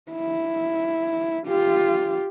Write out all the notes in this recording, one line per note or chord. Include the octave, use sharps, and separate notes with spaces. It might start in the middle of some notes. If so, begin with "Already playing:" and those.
E4
F4 G4